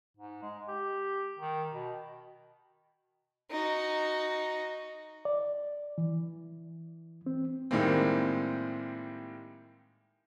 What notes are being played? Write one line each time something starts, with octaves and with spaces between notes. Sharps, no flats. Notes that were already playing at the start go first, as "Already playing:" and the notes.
G#2
G#3
G4
D#3
B2
D#4 F#4
D5
E3
C4
A2 D#3 G3 G#3 A#3 C4